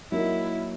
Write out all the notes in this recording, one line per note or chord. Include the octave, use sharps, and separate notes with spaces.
F#3 A#3 D#4 E4